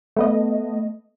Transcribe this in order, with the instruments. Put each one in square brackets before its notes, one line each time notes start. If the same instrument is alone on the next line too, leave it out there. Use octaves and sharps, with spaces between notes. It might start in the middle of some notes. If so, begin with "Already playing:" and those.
[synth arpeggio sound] A3 B3 D#5